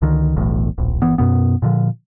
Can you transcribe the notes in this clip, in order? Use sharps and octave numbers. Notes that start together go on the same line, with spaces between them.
C#2 D3 D#3
E1 B1 E2 A2
D1 A#1
G1 E3 B3
F#2 B2 B3
A#2 D3 D#3 F3